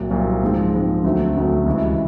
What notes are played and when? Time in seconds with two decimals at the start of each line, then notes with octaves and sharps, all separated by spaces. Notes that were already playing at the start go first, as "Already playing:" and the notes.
Already playing: C2 A#2 F#3
0.11 C2 A#2 F#3
0.42 G#2 F3 G#3 C4
0.73 G#2 F3 G#3 C4
1.04 D2 D3 F#3 A3 C4
1.36 D2 D3 F#3 A3 C4
1.66 C#2 C3 E3